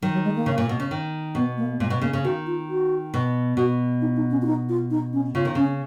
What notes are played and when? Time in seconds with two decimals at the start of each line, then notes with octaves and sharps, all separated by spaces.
0.02 D#3 F#3
0.13 F#3
0.25 G#3
0.36 A#3
0.46 C#3
0.58 A#2
0.69 B2
0.80 C#3
0.91 D#3
1.35 B2 B3
1.58 A#3
1.80 A#2 G#3
1.90 B2
2.02 C#3 A#3
2.13 C#3
2.24 D#3 F#4
2.47 F4
2.69 F#4
3.14 B2
3.57 B2 F#4
4.02 D#4
4.17 D#4
4.31 C#4
4.42 F4
4.46 D#4
4.69 F4
4.91 D#4
5.13 C#4
5.35 C#3 F4
5.45 D#3
5.55 C#3 C#4